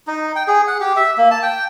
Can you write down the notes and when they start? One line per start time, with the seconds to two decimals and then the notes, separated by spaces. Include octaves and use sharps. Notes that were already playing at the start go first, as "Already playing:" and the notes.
0.07 D#4
0.36 G5
0.48 G#4
0.67 F#5
0.81 G4
0.96 E5
1.18 A#3
1.31 A5
1.43 G5